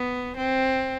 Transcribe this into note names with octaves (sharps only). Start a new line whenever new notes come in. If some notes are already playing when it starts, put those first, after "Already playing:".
Already playing: B3
C4